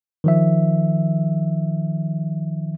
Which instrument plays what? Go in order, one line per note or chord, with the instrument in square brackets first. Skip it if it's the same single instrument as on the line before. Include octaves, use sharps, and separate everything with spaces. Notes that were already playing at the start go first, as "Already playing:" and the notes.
[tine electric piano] D#3 F3 E5